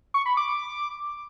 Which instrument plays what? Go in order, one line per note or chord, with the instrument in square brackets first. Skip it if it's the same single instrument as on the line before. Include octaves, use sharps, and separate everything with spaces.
[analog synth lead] C#6
B5
D6